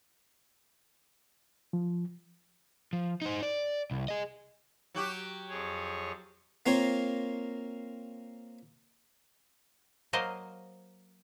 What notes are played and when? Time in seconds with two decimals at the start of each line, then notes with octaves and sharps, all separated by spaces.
1.73 F3
2.93 F3
3.22 D#4 C5
3.43 D5
3.91 C2
4.08 G#4 D#5
4.95 F#3 F#4 G4
5.49 F2 G#4 C#5
6.66 A#3 C4 F4 A#4 C#5
10.13 F#3 A#3 A#4 C5 D#5 F5